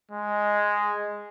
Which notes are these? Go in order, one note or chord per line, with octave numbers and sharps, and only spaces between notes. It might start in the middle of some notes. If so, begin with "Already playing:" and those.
G#3